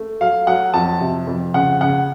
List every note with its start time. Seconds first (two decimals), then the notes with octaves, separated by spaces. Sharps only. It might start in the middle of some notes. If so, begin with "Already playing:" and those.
Already playing: A3
0.21 F#3 F5
0.47 F#3 F#5
0.74 F2 A5
1.01 C3
1.27 F2
1.54 C#3 F#5
1.81 C#3 F#5